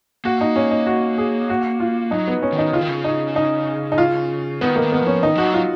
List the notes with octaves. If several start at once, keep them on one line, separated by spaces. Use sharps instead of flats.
A#3 F#4
D#4
C#4
D#4
F#4
G#4
F#4
F4
F#3 D#4
B3
C#4
D#3
D#4
C#3 F4
D#3
C#3
D#4
D#4
D#4
F4
D#3 B3
A#3
D#3
B3
F3 C#4
D#3 D#4
F3 F#4
F#3
F4